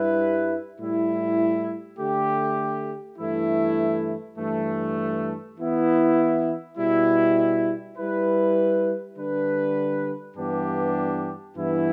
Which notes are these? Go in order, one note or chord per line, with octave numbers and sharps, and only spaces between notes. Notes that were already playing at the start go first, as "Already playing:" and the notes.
Already playing: G2 G3 E4 B4
A2 G3 E4
D3 A3 G4
G2 E3 A3 E4
G2 E3 A3
E3 B3 E4
B2 G3 E4
G3 E4 B4
D3 G3 D4 B4
G2 E3 B3 D4 G4
G2 E3 B3 E4